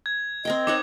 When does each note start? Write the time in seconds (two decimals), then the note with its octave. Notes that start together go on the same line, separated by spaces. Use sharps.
0.06 G#6
0.45 C4 A#4 D#5 G5
0.67 D#4 C#5 F#5 D6